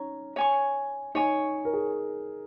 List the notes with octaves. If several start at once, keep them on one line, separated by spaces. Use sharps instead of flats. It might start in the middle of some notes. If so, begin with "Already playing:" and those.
Already playing: C#4 D#4 C#5 A#5 C#6
C#5 G#5 C#6
D#4 C#5 G#5 C#6
A#4
G#4